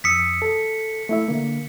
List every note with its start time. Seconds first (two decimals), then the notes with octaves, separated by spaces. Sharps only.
0.04 F2 D#6 E6 B6 C#7
0.42 A4
1.09 A3 E4 E5
1.28 D3 A#3